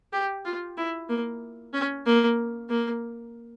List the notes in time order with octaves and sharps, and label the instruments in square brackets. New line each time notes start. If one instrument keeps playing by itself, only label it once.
[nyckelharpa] G4
F4
E4
A#3
C#4
A#3
A#3